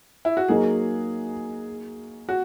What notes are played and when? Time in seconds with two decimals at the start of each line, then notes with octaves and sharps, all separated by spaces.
0.25 E4
0.37 F#4
0.48 F#3 A#3 D#4 G#4
2.29 F#4